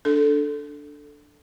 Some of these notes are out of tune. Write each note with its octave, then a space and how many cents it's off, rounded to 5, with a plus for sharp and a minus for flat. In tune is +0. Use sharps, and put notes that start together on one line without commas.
D4 +0 A4 +0